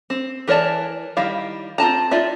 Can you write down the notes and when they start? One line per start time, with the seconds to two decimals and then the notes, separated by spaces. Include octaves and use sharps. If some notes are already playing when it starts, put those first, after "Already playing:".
0.10 C4
0.48 E3 A#4 C#5 D5 A5
1.17 D#3 G3 E4 F5
1.78 C4 F4 A5 A#5
2.11 D#4 F4 D5 E5